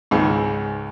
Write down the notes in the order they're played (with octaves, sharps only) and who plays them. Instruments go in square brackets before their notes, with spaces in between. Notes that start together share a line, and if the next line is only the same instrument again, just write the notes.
[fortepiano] C#2 G#2